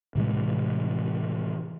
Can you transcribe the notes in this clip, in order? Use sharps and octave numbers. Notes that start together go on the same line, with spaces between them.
A2 C3 E3 G#3